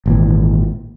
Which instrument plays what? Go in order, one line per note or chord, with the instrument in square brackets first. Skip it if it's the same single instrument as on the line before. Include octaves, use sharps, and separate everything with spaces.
[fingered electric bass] G#1 A#2 E3